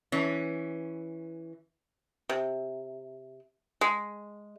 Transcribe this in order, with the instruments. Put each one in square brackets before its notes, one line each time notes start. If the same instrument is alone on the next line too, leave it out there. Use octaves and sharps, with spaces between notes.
[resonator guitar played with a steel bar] E3 C#4
[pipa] C3
G#3